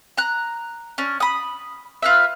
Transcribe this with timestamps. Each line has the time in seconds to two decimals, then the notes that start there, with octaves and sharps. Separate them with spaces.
0.17 A#5 F#6
0.98 C#4 D4
1.20 B5 D#6
2.02 F4 B4 E5